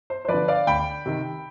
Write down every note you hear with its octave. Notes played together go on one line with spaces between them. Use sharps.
C5
C5
F3 B4 D5
D3
D5 F5
D2 G5 B5
C3 D#3